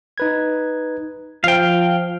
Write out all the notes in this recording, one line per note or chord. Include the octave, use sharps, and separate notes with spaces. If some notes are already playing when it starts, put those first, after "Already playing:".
D#4 B4 G#6
F3 C5 F5 G5 F6